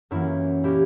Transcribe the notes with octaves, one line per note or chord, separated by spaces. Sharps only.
F#2 E3 A#3 C#4 E4
A#2 A#3 C#4 E4 G4